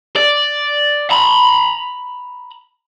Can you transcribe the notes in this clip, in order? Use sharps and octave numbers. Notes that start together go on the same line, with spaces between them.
D5
A#5 B5